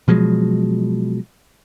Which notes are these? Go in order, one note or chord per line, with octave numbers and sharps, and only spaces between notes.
B2 F3 F#3 G#3